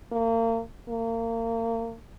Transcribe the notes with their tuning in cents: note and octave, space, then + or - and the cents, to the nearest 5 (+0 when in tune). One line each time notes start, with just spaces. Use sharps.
A#3 -35
A#3 -30